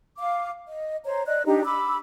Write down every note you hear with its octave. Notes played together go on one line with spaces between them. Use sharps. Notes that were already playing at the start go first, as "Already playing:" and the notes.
F5 D6
D#5
C5 C#5 A#5
D5 D#5 F#6
D4 D#4 G4 A#5
B5 D6 E6